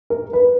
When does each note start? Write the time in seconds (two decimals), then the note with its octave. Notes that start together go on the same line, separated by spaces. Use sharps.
0.10 A#4
0.33 B4